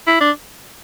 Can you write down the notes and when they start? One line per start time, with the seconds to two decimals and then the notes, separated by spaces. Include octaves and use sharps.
0.07 E4
0.21 D4